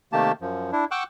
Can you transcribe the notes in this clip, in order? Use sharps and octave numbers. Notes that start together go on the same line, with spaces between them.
C3 D#3 A3 A#3 G4 A5
F#2 F3
D4 E4
F#5 G5 C#6 D6 E6 F#6